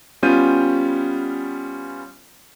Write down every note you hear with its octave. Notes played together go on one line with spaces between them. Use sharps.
G3 B3 C#4 F4 G6 D#7